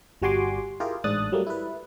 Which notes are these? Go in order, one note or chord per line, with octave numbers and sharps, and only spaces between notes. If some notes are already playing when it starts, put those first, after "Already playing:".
G1 G3 F#4 G#5 C6 D6
E4 F4 G4 G#4 A#4
A1 G#2 D4 D#6 F#6 A6
F#3 G3 A3 A#3
E4 B4